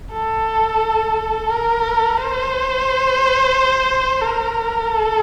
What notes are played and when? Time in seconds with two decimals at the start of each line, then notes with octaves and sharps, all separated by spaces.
0.13 A4
1.49 A#4
2.18 C5
4.22 A#4
4.90 A4